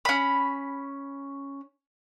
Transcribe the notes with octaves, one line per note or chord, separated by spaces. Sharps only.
C#4 B5